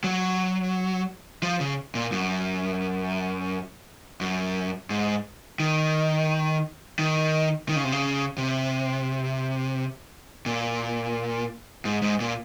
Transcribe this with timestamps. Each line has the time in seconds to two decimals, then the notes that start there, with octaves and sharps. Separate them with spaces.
0.04 F#3
1.43 F3
1.60 C#3
1.95 A#2
2.12 F#2
4.21 F#2
4.90 G#2
5.60 D#3
6.99 D#3
7.69 D#3
7.76 C#3
7.84 C3
7.92 C#3
8.38 C3
10.46 A#2
11.85 G#2
12.02 G#2
12.20 A#2